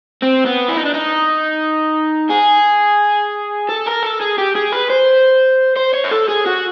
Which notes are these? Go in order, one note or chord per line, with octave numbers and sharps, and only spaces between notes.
C4
B3
E4
D#4
D4
D#4
G#4
A4
A#4
A4
G#4
G4
G#4
B4
C5
C5
C#5
A#4
A4
G#4
F#4